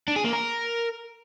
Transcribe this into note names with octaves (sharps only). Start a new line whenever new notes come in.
D4
G#4
A#3
A#4